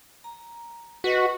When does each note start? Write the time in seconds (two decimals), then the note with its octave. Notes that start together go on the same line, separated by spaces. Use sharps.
0.24 A#5
1.04 F#4 B4 D#5 F#5